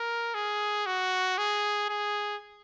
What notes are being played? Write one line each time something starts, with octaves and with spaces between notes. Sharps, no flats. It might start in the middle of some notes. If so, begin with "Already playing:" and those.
Already playing: A#4
G#4
F#4
G#4
G#4